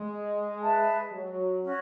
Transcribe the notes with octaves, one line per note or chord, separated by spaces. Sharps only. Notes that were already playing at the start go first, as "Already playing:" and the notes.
Already playing: G#3
G#4 B4 E5 A5
F#3
C#4 F#4 C#5